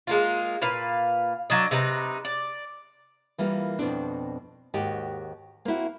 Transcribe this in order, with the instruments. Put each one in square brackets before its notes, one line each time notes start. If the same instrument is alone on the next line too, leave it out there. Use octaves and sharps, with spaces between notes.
[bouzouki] G#3 A#3 F4
A#2 B4 F5
F#3 D4 D#5
C3 D#4 B4
D5
[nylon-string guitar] E3 G3 A#3 F4
F2 B2 C4 D4
D#2 G#2 F#4 G4 D#5
A#3 C4 E4 F#4